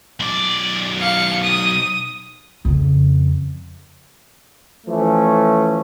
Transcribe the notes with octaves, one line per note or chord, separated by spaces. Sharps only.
B1 D5
F5 C#7
D#6
F2 C#3
E3 F3 A3 C#4